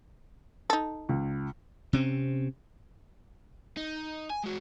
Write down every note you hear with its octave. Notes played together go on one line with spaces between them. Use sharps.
D#4 A4
C#2
C3 C4 C#4
D#4
G#5
G#3 F#4